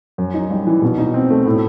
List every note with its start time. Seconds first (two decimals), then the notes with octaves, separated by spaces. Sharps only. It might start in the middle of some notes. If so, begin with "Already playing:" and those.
0.18 F#2
0.34 D#4
0.50 G3
0.67 E3
0.82 B2
0.98 D#4
1.14 C4
1.31 A3
1.45 A2